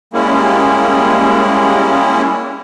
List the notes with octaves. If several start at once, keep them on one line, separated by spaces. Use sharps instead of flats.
G3 G#3 A#3 C#4 E4